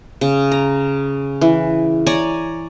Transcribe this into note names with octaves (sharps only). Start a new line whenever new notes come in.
C#3
A#5
E3
C#5 D5 G#5 A#5